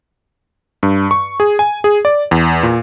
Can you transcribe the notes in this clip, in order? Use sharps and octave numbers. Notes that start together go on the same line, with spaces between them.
G2
C#6
G#4
G#5
G#4
D5
E2
A#2